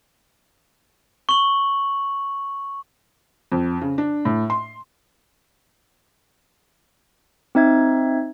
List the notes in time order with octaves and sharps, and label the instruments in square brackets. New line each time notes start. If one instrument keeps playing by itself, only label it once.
[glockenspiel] C#6 F#7
[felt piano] F2
C#3
D4
A2
C6
[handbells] C4 D#4 E5 G#6